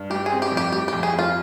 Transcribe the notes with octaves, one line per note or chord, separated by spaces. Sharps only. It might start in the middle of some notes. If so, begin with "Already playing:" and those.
Already playing: G2
G3 G4
C4 G#4
G4
F2
G4
G3 G4
G4
F2
G#4
F2 F4